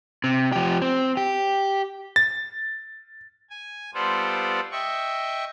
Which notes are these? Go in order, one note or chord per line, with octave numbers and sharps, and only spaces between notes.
C3
F3 G4
C4
G4
A6
G#5
G3 B3 F4 A4 C5 D5
D#5 E5 G5 C#6